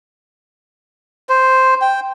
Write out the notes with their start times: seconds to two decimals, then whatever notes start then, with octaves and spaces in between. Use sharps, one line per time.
1.29 C5
1.82 G5